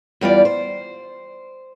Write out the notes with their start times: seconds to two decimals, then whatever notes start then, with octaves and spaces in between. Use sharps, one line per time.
0.21 E2 G3 F4 D5
0.45 C5